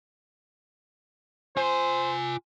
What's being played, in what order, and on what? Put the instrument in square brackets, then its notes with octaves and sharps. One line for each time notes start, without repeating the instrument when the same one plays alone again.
[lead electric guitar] F4 G#5 [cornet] C5